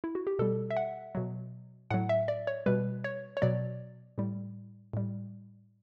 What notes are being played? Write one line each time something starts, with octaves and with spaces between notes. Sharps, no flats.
E4
F#4
G4
B2 G3 A4
E5
F#5
B2 F#3
A2 F#3 F#5
E5
D5
C#5
B2 G3 B4
C#5
C#5
B2 F#3 D5
A2 G3
A2 G3